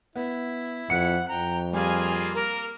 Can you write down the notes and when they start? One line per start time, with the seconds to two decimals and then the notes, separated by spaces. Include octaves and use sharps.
0.16 B3 E4
0.90 F2 F#5 C#7
1.28 F2 G5 A#5
1.73 G3 A#3 F4 G#4 G#5
2.34 A#3 A#4